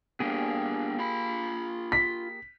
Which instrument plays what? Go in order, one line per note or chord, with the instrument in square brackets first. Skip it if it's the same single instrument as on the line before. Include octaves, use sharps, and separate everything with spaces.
[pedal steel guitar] A#3 G4 G#4 [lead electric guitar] B3 D4
[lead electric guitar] F4 B5
[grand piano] B6